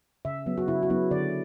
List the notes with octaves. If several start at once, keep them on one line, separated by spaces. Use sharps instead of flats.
C#3 E5
F#3 B3
F#4
C#3 E4
F#4
F#3 B3 E4
D3 D5